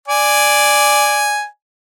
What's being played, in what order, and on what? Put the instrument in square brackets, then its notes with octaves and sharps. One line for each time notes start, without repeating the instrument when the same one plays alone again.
[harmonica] D5 G#5